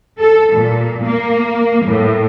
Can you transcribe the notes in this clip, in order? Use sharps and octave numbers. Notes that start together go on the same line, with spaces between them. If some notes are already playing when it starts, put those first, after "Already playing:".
A4
A#2
A#3
A2